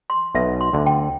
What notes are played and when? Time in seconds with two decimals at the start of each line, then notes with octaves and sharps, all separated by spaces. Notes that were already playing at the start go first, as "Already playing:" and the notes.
0.10 C6
0.35 B1 B2 E5
0.61 C6
0.73 D2 D3
0.86 G5